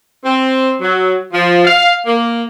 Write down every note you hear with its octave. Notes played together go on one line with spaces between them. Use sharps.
C4
F#3
F3
F5
A#3